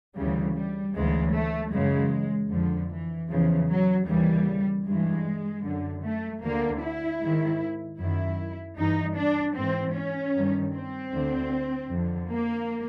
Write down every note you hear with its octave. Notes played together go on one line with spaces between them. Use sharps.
D2 C#3 E3 G3
G3
D2 C#3 E3 G#3
A3
F#2 C#3 E3 G#3
F2 D3 F3
E3
E2 C#3 E3 F3
F#3
D#2 C#3 E3 G3
G2 E3 G#3
F#2 D3
A3
D2 D3 A#3
E4
G#2 D#3
F#2 D#3 E4
G2 E3 D#4
D4
G#2 E3 C4
C#4
G2 D#3
C4
D2 D3
F2 D3
A#3